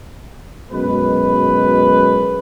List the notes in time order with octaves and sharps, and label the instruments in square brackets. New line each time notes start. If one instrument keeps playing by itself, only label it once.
[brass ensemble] F#2 B2 G#3 B4